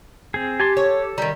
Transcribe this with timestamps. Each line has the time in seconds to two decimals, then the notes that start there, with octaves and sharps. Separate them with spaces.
0.34 C4 G#4
0.60 G4 G#5 A5 C6
0.77 A4 C#5
1.18 D#3 G3 A#5